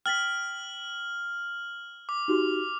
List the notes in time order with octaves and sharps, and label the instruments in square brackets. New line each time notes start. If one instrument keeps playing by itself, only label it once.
[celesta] G5 A6 B6 [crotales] F6 F#7
[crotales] D6
[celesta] D#4 F#4 G4